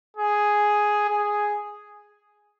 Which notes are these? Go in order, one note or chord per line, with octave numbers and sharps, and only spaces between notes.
G#4
G#4